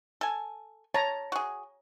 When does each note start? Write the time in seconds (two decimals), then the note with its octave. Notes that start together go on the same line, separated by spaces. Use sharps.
0.21 A4 G#5
0.94 C#5 A5 A#5
1.32 F#4 G#4